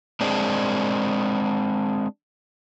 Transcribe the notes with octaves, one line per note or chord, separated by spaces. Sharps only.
G#3 C4 D4